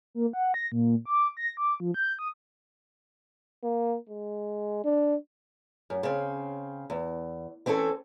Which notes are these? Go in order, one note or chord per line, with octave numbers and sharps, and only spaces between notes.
A#3
F#5
A#6
A#2
D6
A#6
D6
F3
G6
D#6
A#3
G#3
D4
F#2
C#3 C4
E2
E3 C4 C#4 E4 A4